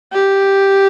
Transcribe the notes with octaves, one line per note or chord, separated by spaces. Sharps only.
G4